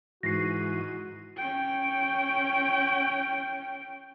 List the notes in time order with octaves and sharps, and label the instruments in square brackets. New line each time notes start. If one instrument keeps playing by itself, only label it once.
[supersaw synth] G#2 D#7 [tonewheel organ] E3 [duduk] F#4 [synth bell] A#6 C7
[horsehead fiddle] C#4 G5